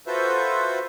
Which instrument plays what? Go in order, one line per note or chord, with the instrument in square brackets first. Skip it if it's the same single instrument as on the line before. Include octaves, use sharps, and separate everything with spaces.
[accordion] F4 F#4 A4 B4 C5 E5